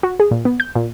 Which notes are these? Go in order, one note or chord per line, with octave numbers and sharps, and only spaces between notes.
F#4
G#4
A#2
B3
G6
A#2